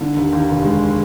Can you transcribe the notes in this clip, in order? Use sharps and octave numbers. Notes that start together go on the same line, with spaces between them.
D3
D#2
D#2
F1
G#3